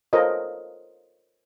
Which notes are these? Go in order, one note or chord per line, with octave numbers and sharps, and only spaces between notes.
F4 A4 A#4 C5 C#5 D#5